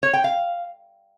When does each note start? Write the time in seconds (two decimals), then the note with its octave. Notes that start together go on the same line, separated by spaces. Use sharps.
0.03 C#5
0.13 G5
0.24 F5